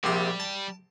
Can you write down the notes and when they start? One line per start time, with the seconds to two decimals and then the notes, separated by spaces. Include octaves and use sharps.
0.04 A#1 C3 G3 C6
0.40 A5